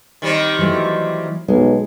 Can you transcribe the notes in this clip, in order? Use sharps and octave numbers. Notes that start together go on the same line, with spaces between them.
D#3 G3 C4
E3 F#3 A3
B1 G#3